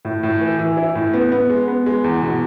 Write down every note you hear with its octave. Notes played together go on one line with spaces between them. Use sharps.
A2
A2
E3
E3
E4
A2
B3
B3
G#3
B3
G#3
E2
B2